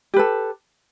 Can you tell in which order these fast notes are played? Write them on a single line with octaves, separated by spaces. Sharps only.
G4 B4 A4